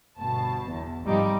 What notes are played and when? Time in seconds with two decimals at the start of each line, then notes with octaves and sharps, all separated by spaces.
0.19 G1 B2 A5
0.70 E2
1.04 G#1 C3 F3 G3 D#4 D6